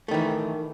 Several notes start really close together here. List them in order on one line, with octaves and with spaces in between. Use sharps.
A3 D#3 E3